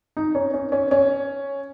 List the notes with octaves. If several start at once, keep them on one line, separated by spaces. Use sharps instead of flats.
D#4
C#4
C#4
C#4
C#4